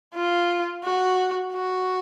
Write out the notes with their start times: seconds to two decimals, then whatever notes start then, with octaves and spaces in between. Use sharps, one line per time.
0.14 F4
0.84 F#4
1.53 F#4